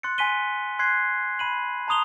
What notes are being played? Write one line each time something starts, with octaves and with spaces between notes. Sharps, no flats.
C6 F#6 A6 C#7
G#5 C6 B6 D#7 G7
C6 F#6 G#6 C7
B5 D#7 F#7
A5 A#5 C6 D#6 F7 G7